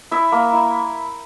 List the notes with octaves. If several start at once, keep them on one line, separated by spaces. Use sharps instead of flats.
E4 E5
A#3
E4